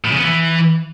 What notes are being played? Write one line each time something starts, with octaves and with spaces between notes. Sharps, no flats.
A2
C#3
B3
E3